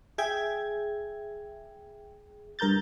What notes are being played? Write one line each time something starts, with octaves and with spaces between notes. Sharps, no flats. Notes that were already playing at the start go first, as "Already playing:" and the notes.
G#4 E5 G5 G#6
G2 A#4 A#5 G6 A6